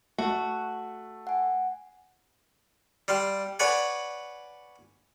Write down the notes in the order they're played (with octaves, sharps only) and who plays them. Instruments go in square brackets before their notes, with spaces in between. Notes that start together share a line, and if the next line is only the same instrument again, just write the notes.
[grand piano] A3 [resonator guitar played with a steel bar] F#4
[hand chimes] F#5 G#5
[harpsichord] G3 F5 C6
B4 C#5 D5 F#5 G#5